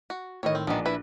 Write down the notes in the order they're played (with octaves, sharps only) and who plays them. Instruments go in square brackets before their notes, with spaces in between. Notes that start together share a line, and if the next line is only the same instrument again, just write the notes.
[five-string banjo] F#4
[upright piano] A2 D#3 [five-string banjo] C#5 D#5
[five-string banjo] C4
[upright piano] A#1 D4 [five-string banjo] D#3 B3
[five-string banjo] E4 B4